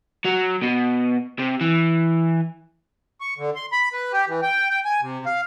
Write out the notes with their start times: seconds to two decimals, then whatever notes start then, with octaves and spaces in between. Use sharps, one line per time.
0.25 F#3
0.62 B2
1.39 C3
1.61 E3
3.21 C#6
3.38 D3
3.56 C6
3.72 B5
3.93 B4
4.12 G4
4.28 E3
4.42 G5
4.70 G5
4.85 G#5
5.02 C3
5.26 F5